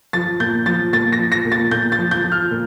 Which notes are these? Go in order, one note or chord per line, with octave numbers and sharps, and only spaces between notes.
F3 A6
A#2 G6
F3 A6
A#2 A6
A#6
F3
A#6
A#2
A6
A#2 G6
A6
F3
G6
F3
F6
A#2